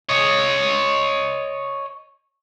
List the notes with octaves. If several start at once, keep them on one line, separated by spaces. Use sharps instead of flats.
C#5 D#5